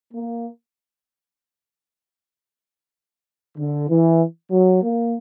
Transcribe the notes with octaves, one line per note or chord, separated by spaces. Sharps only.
A#3
D3
E3
F#3
A#3